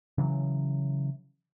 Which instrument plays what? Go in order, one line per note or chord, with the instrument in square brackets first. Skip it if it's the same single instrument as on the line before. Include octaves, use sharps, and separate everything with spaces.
[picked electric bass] C#3 E3 F#3